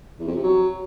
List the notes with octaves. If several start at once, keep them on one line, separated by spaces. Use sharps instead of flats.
E2
F2
C3
F#3